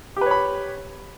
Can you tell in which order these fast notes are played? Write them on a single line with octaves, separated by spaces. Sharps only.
G4 B4 C#5 B5